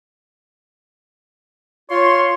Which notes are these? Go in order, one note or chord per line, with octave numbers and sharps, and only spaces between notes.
F4 C#5 C6